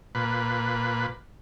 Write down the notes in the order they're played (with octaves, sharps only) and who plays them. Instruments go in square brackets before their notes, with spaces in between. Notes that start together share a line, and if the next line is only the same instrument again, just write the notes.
[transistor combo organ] A#2 B4